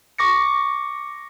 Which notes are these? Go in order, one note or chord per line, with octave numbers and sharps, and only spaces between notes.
C#6 D6 A#6 C#7